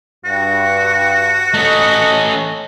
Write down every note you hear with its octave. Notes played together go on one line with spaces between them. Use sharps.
G2 F#4
A3 C#4 D#5